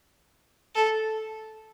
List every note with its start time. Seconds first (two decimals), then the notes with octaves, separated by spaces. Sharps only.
0.75 A4